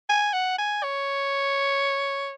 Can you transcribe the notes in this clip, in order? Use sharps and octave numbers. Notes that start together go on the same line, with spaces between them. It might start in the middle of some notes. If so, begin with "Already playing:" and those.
G#5
F#5
G#5
C#5